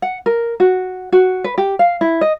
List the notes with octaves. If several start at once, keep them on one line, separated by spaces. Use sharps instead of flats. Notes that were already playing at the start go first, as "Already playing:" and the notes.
F#5
A#4
F#4
F#4
B4
G4
F5
E4
D#5